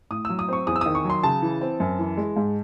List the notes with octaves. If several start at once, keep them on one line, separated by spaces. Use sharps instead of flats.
A2 D#6
F#3 E6
D#6
C4 C#6
E2 D#6
E6
D#3 D#6
C#6
F#3 C6
C#3 A5
E3
C4
F#2
E3
G#3
G#2